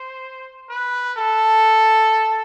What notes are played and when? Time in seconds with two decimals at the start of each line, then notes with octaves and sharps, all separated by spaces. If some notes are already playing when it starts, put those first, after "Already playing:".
Already playing: C5
0.70 B4
1.17 A4